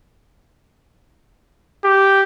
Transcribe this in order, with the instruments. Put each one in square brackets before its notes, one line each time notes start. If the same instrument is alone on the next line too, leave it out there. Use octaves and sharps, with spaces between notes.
[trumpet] G4